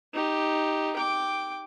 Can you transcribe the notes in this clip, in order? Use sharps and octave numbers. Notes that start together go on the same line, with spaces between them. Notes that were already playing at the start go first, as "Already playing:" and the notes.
D#4 G4
G5 D6